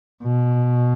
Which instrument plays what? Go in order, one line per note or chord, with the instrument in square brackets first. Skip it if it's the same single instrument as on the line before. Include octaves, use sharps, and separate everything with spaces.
[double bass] B2